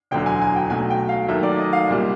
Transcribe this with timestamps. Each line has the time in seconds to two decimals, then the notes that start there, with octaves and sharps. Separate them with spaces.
0.11 E1 D2 D3 F#3 G5
0.26 G#5
0.41 G#5
0.56 G5
0.70 B1 B2 F#3 A3 G#5
0.90 G5
1.09 F5
1.28 D#2 D#3 F#3 A3 E5
1.43 D5
1.58 D#5
1.73 F5
1.88 C2 A#2 G3